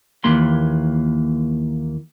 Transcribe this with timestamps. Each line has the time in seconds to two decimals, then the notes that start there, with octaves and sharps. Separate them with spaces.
0.24 D#2 E3 A#3 B5 C6